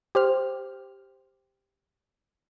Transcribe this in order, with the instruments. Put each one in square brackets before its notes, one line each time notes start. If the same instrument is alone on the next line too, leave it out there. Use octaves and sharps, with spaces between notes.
[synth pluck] G4 C5 F6